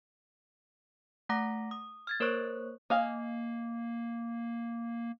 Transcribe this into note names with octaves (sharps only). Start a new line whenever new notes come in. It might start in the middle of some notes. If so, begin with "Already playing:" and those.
A3 F#5 A#5 D6 A#6
D#6
F6 G#6 A6
A#3 A#4 C5 C#5 C#6 F#6
A#3 D#5 F5 G#5